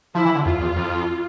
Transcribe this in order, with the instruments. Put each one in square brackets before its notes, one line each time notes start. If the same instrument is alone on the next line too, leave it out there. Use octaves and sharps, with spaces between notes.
[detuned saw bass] F3 [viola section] E4
[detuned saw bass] E3
D3
[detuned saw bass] F2 [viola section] F4
[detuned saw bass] E2
F2